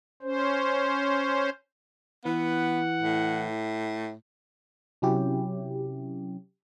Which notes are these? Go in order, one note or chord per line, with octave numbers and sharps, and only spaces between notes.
C#4 C5
E3 B3 F#5
A2
C3 F#3 C#4 E4 G4